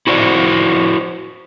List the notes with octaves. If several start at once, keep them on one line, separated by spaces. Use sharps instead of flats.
E4 F#4 C5 D5